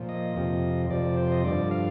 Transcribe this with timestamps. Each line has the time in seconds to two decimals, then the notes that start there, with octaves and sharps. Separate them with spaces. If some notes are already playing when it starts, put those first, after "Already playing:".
Already playing: A#2 F3
0.09 D#5
0.35 F2 C3 F3
0.91 F2 C3 F3 D5
1.17 C5
1.32 D#5
1.44 G2 D3 F3 D5
1.71 F5